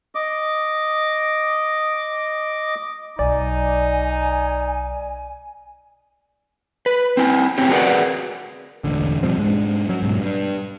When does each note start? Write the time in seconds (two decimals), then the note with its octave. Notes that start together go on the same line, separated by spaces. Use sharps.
0.15 D#5 D6
3.19 B1 D#4 D5 G#5
6.86 B4
7.17 C4 E4 G#5
7.58 F#2 F#3 C4 C#4 G4
7.70 F#4 G#4 A#4 B4 D5 F#5
8.84 E1 A1 D3
9.23 B2 F3 G3 C4
9.38 G#2 G#3 C#4 D4
9.89 F#3 C#4
10.02 G#2 B2
10.18 G2